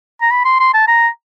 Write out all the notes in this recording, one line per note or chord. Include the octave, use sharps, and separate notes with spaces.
A#5
B5
C6
C6
A5
A#5